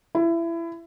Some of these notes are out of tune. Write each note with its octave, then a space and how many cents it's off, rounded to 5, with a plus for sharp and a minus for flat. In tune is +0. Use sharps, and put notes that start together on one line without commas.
E4 +25